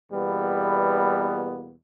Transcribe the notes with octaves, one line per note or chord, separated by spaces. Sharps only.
E2 B2 G3 A#3 B3